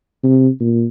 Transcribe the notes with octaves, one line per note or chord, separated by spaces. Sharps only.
C3
A#2